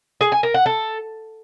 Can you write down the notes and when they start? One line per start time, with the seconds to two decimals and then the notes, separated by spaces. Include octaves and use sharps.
0.21 G#4
0.32 G#5
0.43 A#4
0.54 F#5
0.66 A4